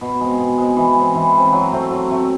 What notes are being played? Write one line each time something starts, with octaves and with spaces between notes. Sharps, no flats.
B2
G#3 C4
B2
G#3 C4
E3
G#3 C4
E3
G#3 C4
F#3
A3 C4
F#3
A3 C4